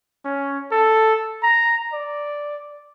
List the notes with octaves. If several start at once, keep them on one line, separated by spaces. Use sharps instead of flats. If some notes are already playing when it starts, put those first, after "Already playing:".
C#4
A4
A#5
D5